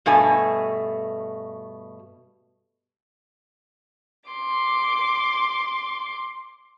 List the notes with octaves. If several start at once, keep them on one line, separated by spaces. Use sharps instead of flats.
G2 B2 A3 G#5
C6 D6